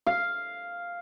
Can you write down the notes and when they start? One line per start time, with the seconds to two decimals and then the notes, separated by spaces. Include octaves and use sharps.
0.07 F5